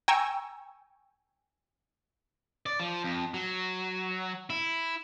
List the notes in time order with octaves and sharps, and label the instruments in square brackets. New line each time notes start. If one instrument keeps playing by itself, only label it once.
[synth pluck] G5 G#5 A#5 C#6 E6
[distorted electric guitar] D5
F3
F2
F#3
E4